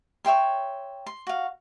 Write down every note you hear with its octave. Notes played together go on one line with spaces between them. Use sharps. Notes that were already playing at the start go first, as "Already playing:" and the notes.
C#5 E5 G5 C6
C6
F#4 F5